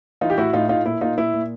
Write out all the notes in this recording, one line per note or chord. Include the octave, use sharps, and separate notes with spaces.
E3 D#4 F4
G4
A2 E4 F#4
A2 D#4 F4
A2 D#4 F4
A#2 E4
A#2 D#4 F4
A#2 E4
A#2